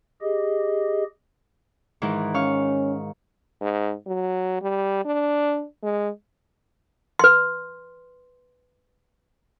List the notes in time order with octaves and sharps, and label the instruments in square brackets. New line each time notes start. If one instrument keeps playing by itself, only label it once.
[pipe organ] G4 G#4 D#5
[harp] G#2 D#3 E3
[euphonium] C#4 [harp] F5 C#6 F6
[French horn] G#2
F#3
G3
D4
G#3
[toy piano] B4 C6